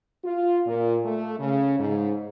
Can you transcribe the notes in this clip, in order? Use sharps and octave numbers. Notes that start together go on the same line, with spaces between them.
F4
A#2
A3
C#3
G#2